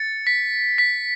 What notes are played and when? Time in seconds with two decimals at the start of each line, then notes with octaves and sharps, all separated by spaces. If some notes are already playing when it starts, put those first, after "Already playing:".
Already playing: A6 C#7
0.27 B6
0.78 B6